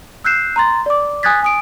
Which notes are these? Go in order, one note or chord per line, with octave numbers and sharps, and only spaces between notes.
E6 F#6 G6 C7 E7
A#5 C6 A6
D5 D6
G#5 D#6 F#6 G#6 A6 B6
G#5 D#6 D7